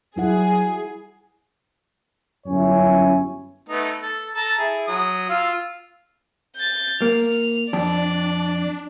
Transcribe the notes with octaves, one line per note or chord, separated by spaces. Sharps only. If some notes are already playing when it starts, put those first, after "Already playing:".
F#3 G3 E4 G#4 F#5
G1 F#2 C#4 E4 C#5 G#5
A3 B3 D#4
A4
A4 A5 A#5
E4 G#4
F#3 D#6
F4 F5 E6
G6 A6
A#3 F7
F2 D4 D5